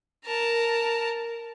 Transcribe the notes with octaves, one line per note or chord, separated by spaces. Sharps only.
A#4 A5